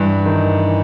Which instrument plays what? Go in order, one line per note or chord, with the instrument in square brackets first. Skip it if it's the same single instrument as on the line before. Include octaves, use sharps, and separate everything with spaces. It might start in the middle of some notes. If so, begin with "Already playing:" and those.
Already playing: [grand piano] G2 [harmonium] E3
[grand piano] D#3